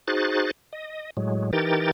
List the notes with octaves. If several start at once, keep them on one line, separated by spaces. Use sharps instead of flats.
D#4 F#4 G#4 C5 F#6 A6
D#5
A2 F#3 G#3
E3 D#4 G4 A#4 G5 A6